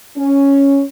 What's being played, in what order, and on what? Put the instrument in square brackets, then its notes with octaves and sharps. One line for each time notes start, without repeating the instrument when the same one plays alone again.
[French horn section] C#4